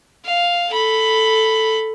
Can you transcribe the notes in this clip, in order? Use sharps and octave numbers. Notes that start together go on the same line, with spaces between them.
F5
A4 B5